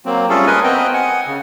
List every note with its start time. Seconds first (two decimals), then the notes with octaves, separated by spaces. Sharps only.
0.06 F#3 A#3 C4
0.29 G3 A3 C#4 F4 G#4 A4
0.47 A#4 B4 D#5 G#5
0.64 B3 C4 D#5 G5
0.94 F#5 G#5
1.26 C#3